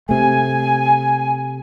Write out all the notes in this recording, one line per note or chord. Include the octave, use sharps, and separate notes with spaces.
C3 A3 G#5